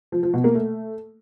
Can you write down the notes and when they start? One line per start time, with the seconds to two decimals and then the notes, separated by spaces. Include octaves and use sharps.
0.12 F3
0.23 F3
0.34 B2
0.44 A#3
0.55 A3